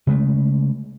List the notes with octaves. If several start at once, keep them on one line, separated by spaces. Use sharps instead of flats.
C#3 G#3 A3